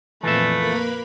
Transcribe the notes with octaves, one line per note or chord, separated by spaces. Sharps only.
F2 A#2 E3 A3 F4 B4 E5
A#3 A#4 B5